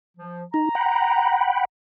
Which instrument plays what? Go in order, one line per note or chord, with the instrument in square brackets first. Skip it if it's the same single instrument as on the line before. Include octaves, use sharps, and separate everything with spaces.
[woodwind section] F3
[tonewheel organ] D#4 [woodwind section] A#5
[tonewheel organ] F#5 G5 B5